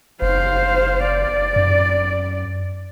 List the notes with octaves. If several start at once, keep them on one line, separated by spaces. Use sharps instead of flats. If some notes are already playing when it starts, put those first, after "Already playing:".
F#1 C5 F5
D5
F#2